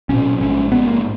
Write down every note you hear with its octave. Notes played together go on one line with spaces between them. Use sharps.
B1 A#2 C#4
A#1 G#2 C#4
A#1 G#2 B3
A#3